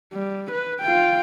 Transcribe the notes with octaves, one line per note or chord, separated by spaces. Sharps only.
G3
B4
F4 G5